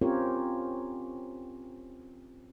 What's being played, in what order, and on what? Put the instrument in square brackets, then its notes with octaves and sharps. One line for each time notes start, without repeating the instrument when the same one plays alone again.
[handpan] C4 C#4 F4 G4 A#4 C#5